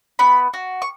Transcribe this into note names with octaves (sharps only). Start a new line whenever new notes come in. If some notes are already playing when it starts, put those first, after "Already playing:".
B3 B5
F#4
C#6